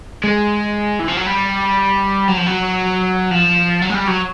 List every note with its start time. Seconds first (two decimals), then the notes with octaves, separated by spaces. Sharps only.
0.24 G#3
0.99 E3
1.08 F3
1.17 F#3
1.26 G3
2.28 F#3
2.37 F3
2.46 F#3
3.31 F3
3.82 F#3
3.90 G#3
3.95 G3
4.07 F#3